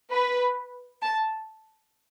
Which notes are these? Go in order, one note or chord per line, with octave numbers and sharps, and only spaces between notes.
B4
A5